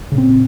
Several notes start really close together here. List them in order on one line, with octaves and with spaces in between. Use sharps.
C#3 A#2 C4